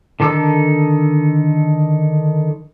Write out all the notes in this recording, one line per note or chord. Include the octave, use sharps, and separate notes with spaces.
D3 D#3 A4 D6 E6